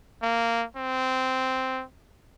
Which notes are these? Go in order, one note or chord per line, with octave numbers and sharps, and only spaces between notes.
A#3
C4